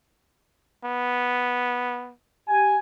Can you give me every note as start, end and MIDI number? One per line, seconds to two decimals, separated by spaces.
0.85 2.13 59
2.48 2.77 67
2.48 2.77 80